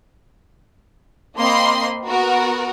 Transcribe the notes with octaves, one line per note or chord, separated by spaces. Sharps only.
A#3 C4 D#5 B5 C6
B3 F#4 A#4